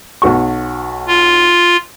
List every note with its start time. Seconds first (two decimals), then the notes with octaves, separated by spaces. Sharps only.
0.22 B1 F#4 C#6
1.08 F4